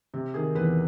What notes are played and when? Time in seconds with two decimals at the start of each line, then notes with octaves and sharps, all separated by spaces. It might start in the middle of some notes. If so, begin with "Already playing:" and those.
0.14 C3
0.34 D#3 G#4
0.55 E2 B4